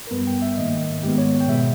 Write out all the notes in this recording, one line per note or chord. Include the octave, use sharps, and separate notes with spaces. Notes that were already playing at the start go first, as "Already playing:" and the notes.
A#4
G2 G3 B3 B4
G5
E5
G#2 D#3 A#3 D#5
G#2 D#3 G#3 B3 G4
C#5
G5
B2 G#3 B3 E5